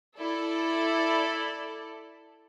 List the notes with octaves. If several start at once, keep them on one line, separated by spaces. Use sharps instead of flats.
E4 A4 D5